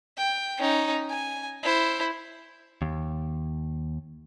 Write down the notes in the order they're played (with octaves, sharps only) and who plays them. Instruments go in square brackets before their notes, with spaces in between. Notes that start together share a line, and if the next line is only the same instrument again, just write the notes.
[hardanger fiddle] G5
C#4 D#4
G#5
E4 C5
[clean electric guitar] D#2